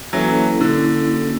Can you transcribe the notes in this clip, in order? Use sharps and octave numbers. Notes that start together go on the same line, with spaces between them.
E3 F#3 A#3 C#4 E4 A4
D3 A#3 C#4 E4 A4
A#3 C#4 F#4